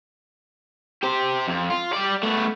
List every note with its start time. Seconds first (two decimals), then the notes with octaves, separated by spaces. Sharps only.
1.03 G4 C5
1.47 F2
1.70 F4
1.93 G3 D5
2.23 A3 B3